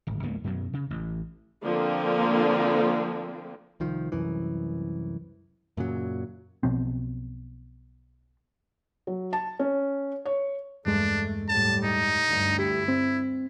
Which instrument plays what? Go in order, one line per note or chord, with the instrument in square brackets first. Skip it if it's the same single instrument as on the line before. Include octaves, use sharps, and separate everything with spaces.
[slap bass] D1 G#1
C#2 G#2 A#3 B3
F#2 B2 F#3
C#3
A1
[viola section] D3 F3 A#3 C4
[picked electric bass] C2 D#3 F3
C2 F#2 E3
F#2 A#2 C#3 F#3
B1 B2 F3 C4
[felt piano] F#3
A5
C#4
C#5
[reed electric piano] E2 G2 G#3 [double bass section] A3 [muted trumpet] D4
[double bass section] A2 G3 [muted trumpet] A5
[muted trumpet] D#4
[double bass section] D2 G2
[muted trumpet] E4 [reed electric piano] G4
[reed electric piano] C4